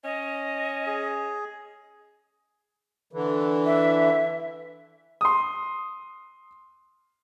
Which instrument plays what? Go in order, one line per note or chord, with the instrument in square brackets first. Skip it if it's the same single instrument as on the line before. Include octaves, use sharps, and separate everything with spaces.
[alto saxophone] C#4 [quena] D#5
[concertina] G#4
[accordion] D3 E3
[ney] E5
[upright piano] C6 D#6